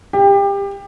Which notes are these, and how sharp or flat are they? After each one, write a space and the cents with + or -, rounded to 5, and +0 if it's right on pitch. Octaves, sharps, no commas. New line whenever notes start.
G4 +25